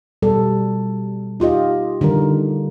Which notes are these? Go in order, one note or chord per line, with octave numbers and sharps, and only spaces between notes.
B2 G3 A4
D#4 F4 G4 D#5
D3 D#3 G3 A#4